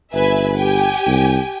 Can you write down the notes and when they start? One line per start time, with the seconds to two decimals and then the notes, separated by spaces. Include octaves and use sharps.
0.14 G1 B4 E5 G#5
0.57 G4 G5 G#5
1.06 C2